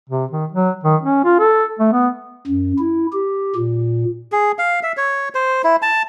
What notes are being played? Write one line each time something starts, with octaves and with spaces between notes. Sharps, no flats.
C3
D#3
F#3
D#3
C#4
F4
A4
A3
B3
F#2
E4
G4
A#2
G#4
F5
E5
C#5
C5
E4
A5